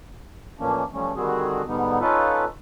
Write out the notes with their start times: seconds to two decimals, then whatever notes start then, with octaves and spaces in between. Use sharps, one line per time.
0.59 A2 E3 F3 A#3 C#4 D4
0.93 E3 F3 G3 A3 C#4
1.16 D3 D#3 G3 C4 F#4 G#4
1.67 G#2 D3 G3 B3 D#4
2.01 C#4 D#4 F4 A4 B4